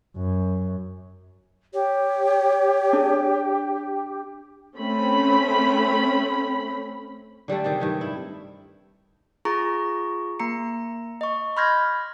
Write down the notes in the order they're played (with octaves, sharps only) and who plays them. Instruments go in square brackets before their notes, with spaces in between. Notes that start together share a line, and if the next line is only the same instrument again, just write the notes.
[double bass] F#2
[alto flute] G4 [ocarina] C#5
[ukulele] D4 G#4
[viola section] A3 C4 C#4 B5
[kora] D3 G3 A3 A4
C3 D#3 G4 G#4
G2 D#3 A3
E4
[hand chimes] F4 G#4 A#5 C#6
A#3 A#5 C#7
D#5 C#6
B5 C6 F6 G6 G#6 A#6